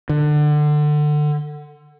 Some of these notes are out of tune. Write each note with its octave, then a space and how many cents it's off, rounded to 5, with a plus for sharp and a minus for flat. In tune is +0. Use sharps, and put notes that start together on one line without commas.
D3 +25